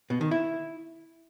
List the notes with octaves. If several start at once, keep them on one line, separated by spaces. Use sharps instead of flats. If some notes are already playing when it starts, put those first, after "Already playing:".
B2
D#3
E4